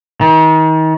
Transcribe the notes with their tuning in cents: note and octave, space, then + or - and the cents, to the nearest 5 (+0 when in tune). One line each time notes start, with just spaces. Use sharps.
D#3 +35